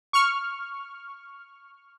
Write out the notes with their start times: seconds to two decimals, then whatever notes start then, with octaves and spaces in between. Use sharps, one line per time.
0.13 C#6 F6